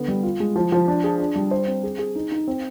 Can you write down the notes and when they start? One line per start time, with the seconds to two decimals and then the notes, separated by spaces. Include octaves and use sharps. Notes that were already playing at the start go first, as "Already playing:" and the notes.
Already playing: D3 B3
0.08 G3
0.23 F4
0.40 G#3
0.56 F3
0.72 F3
0.88 D4
1.04 G#4
1.20 D4
1.36 G3
1.51 C5
1.67 C4
1.83 G#4
1.99 G#4
2.16 D#4
2.32 D#4
2.48 C4